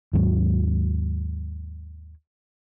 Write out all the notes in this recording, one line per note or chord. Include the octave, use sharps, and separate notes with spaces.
D#2 G#2 F#3